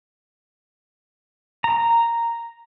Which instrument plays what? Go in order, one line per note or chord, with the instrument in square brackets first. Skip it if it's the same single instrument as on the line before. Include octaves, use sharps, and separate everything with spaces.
[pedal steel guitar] A#5